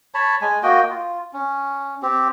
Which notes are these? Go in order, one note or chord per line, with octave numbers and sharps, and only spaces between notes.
C#5 A5 B5
G#3 G#5
A#3 F#4 D#5 G5
F4
C#4
C4 G4